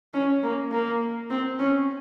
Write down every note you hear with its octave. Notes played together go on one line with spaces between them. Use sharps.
C#4
A#3
A#3
C4
C#4